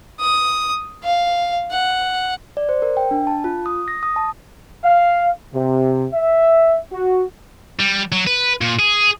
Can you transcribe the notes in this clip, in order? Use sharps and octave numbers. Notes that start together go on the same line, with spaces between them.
D#6
F5
F#5
D5
C5
A#4
G5
D4
A5
F4
D#6
A#6
D#6
A5
F5
C3
E5
F#4
G3
F#3
B4
A#2
G#4